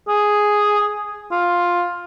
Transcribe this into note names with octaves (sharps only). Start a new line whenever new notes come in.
G#4
F4